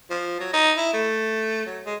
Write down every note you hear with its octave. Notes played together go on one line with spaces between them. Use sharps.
F3
F#3
D#4
E4
A3
F#3
G#3